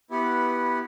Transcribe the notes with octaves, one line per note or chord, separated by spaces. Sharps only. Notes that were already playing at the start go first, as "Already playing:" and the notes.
B3 E4 G4 B4 F#5